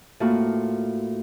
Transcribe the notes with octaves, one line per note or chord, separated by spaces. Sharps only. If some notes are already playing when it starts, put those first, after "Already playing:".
A2 A#3 C4 F4 F#4